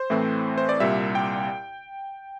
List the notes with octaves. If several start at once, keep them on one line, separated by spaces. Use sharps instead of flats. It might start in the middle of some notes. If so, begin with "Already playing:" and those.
Already playing: C5
A2 E3 A3 C4
C5
D5
C2 A#2 G3 E5
G5